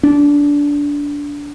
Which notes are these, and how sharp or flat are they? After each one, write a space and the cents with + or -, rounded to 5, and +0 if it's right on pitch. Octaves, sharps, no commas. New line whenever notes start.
D4 -20